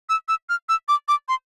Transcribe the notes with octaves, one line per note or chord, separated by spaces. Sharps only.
E6
E6
F6
E6
D6
D6
C6